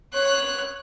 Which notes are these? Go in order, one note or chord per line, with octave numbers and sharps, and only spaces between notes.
C#5 F#6